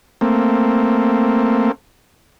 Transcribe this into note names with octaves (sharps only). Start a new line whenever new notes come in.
A3 A#3 C4